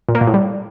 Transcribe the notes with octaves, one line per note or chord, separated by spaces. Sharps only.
A#2
A#3
A#2
A2
G3